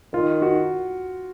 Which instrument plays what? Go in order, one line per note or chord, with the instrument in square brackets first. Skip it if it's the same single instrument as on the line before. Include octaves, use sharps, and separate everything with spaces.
[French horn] D#3 [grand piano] F4
[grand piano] F#4